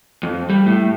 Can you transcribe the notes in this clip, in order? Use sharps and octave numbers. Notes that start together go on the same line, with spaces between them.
F2
G3
A2